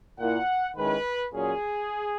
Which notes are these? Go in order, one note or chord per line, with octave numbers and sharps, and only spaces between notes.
A#2 A#3 E4 F#5
D#3 G#3 C#4 E4 B4
A#2 F#3 C#4 G#4